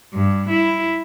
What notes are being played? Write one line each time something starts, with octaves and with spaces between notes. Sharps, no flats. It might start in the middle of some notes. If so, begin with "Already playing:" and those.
G2
E4